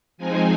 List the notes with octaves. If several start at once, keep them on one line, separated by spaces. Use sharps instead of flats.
F3 G#3 C4 D#4 G#5